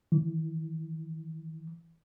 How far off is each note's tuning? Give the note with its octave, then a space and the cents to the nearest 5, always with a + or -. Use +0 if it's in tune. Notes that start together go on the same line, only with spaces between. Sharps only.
E3 -10